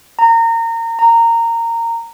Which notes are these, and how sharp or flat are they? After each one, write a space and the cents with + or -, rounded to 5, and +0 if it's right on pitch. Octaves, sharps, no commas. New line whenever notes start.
A#5 -25
A#5 -15